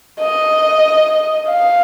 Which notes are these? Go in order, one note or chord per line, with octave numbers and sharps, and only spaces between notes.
D#5
F5